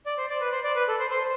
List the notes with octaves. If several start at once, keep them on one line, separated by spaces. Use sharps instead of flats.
D5
C5
D5
B4
C5
D5
B4
A4
C5
C5